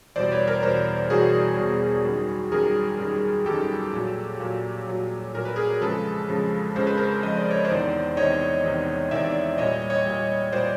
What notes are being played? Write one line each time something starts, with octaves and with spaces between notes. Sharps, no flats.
E2 B2 G3 C5 D5
B4 C#5
A#4 C5
E2 B2 G3 A#4 C5
E2 B2 G3 F#4 G#4
E2 B2 G3
F#2 D#3 G3
F#2 D#3 G3 G#4 A#4
F#2 D#3 G3
F#2 D#3 G3 G4 A4
A#2 F#3
A#2 F#3
A#2 F#3
A#2 F#3 A#4
B4
G#4 A#4
F2 C#3 F3 G#3 A4 B4
F2 C#3 F3 G#3
F2 C#3 F3 G#3 C5
B4
A#4 C5
F2 C#3 F3 G#3 D#5
D5
C#5
C5 D5
E2 C3 D#3
E2 C3 D#3 C#5 D#5
E2 C3 D#3
E2 C3 D#3 D5 E5
A#2 G3 C#5 D#5
C#5 D#5
A#2 G3
A#2 G3 C5 D5